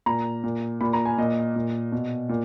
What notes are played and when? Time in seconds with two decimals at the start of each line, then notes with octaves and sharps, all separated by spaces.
0.06 A#2 A#5
0.43 A#2
0.81 A#2 B5
0.93 A#5
1.05 G#5
1.18 A#2 D#5
1.56 A#2
1.92 B2
2.29 A#2